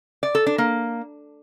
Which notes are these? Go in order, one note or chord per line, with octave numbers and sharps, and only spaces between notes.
D5
A4
D4
A#3